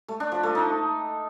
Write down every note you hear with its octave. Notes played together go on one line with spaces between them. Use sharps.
A3
D4
F3
A3
D#4